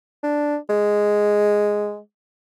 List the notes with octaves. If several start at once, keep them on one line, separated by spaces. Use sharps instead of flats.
D4
G#3